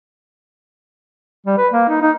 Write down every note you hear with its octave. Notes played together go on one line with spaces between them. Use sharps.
G3
B4
A#3
D#4
D#4